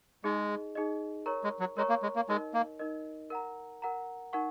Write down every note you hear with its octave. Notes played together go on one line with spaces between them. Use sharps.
G#3 D#4 G#4 D#5
D#4 G#4 D#5
A#4 C#5 A#5 C#6
G#3
F#3
G#3 A#4 C#5 A#5 C#6
A#3
G#3
A#3
G#3 D#4 A#4 D#5
A#3
D#4 A#4 D#5
A#4 F#5 A#5
A#4 F#5 A#5
D#4 A#4 F#5 C#6